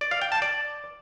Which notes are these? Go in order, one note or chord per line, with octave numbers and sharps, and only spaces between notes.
D5
F5
G5
A5
D5